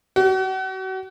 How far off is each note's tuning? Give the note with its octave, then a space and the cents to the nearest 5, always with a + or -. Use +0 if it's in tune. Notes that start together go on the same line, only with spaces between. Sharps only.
F#4 +35